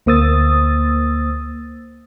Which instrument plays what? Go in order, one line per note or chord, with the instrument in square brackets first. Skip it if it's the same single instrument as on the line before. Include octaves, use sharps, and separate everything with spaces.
[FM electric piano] D2 A#3 C5 D#6 E6 A6